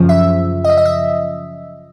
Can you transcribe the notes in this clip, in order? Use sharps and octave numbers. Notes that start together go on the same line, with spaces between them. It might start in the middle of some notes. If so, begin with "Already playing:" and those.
Already playing: F#2 C#3 F3
E5
D#5
E5
D#5
E5